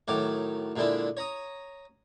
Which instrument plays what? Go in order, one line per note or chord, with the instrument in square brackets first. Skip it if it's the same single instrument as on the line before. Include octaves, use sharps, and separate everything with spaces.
[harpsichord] A2 D#3 F#3 D6
A#2 D3 G#3 D4 E4
C#5 A#5 D#6